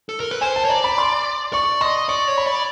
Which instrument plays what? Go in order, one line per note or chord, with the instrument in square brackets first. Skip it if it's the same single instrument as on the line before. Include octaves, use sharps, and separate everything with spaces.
[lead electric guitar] A4
A#4
B4
[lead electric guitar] C5 [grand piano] G#5
[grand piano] A5
[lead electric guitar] C#5
[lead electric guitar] D5 [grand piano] A#5
[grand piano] B5
C6
[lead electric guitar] D5 [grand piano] C#6
[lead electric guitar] D#5 [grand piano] C6
[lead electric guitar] D5 [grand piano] C#6
[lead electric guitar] C#5
[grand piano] B5
[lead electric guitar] D5